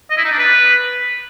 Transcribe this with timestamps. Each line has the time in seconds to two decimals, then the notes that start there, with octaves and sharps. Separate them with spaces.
0.10 D#5
0.17 E4
0.24 D#4
0.31 D4
0.38 B4